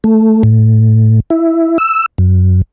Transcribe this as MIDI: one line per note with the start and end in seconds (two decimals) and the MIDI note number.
0.04 0.43 57
0.43 1.20 45
1.30 1.78 64
1.78 2.06 88
2.18 2.62 42